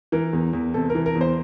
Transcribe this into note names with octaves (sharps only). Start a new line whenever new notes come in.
E3 A#4
E2
E2
C3 A4
A#4
E3
A#4
E2
C5